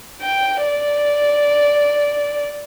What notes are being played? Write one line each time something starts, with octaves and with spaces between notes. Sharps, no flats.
G5
D5